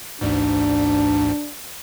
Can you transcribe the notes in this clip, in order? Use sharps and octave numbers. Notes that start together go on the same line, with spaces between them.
A1 D2 G#2 D4